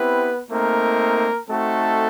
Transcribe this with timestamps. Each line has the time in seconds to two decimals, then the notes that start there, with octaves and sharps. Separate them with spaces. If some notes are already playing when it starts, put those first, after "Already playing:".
Already playing: B3 C4 E4 G4 B4
0.51 A3 A#3 C4 D#4 A#4
1.49 A3 C4 D#4 F#4 A4